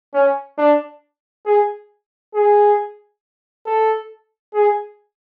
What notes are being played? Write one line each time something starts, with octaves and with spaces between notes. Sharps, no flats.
C#4
D4
G#4
G#4
A4
G#4